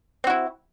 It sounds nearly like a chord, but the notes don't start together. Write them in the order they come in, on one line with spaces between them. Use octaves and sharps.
C4 F#4 E4